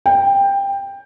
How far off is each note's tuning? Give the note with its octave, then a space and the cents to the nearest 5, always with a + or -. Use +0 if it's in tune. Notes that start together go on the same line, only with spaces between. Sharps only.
G5 +15